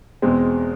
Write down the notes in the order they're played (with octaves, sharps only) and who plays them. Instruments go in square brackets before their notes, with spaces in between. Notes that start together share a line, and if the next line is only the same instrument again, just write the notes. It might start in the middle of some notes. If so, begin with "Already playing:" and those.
[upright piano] E2 B2 G#3 C4